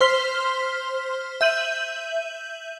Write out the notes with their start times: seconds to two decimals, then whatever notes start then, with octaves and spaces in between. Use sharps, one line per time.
0.01 C5 C6 F6 B6 G7
1.41 E5 G6 D#7 F#7